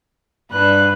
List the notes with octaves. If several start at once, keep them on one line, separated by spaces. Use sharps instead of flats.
G2 D4 B4 F#6